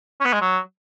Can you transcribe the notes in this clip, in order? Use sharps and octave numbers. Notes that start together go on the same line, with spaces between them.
C#4
B3
G#3
F#3